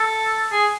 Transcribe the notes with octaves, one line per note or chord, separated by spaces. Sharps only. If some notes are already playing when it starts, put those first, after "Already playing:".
Already playing: A4
G#4